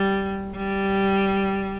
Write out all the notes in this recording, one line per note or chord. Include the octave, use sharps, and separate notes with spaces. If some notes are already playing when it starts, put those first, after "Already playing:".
Already playing: G3
G3